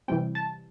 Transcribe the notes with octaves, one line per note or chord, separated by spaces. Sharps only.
C3 E3 G3 C4 G5
A5